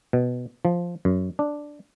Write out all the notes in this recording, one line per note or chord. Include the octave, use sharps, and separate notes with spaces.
B2
F3
F#2
D4